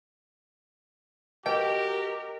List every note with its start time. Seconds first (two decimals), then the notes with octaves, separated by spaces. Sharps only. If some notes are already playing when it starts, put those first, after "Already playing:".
1.46 F#4 G4 A#4 B4 D#5 G5